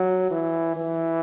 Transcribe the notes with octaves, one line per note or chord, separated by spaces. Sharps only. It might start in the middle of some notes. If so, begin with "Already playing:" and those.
Already playing: F#3
E3
E3